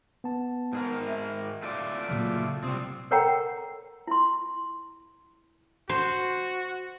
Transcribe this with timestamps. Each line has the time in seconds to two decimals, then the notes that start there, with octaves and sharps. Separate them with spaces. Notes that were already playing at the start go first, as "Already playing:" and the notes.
0.24 B3 A5
0.73 G#2 G#4 A#4
1.08 E5
1.63 A3 F4 D5
2.09 A#2 C#3 F#3
2.64 C3 G3 C4 D#6
3.11 A4 A#4 C#5 F#5 G5 A#5
4.07 E4 C6
5.89 F#4 C5